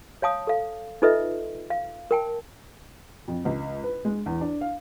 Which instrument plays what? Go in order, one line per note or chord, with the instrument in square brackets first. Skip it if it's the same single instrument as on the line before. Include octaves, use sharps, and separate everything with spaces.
[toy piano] C#5 F5 A5 D#6
A4 F5
D#4 F4 A4 B4 D#5 E5
F5
A#4 G5 A5
[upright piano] F2
C#2
B4
G#3
E2
D4
F5